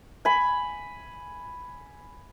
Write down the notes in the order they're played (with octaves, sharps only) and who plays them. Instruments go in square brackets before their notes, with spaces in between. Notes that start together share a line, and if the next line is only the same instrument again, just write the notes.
[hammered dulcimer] G#5 B5